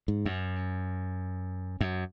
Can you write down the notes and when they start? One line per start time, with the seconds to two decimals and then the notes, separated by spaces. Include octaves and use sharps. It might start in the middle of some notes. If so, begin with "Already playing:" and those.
0.08 G#2
0.26 F#2
1.81 F#2